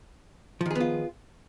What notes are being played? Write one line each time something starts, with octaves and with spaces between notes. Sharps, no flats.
D#3 F3 B3 F4 G#4